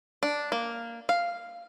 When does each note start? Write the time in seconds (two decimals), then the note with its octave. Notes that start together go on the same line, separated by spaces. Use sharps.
0.23 D4
0.52 A#3
1.09 F5